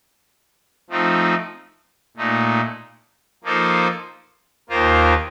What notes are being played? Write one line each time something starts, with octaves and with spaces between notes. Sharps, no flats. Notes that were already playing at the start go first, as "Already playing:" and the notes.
F3 A3 C4 D#4
A#2 A3 D#4
F3 A#3 D#4 A4 C5
D#2 D#3 A#3 F4 C5